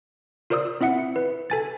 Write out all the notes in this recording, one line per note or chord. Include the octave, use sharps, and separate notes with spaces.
F4 A#4 C5 D5 D#6 E6
C4 E4 E5 F#5 C#7
B4
A4 G#5 A6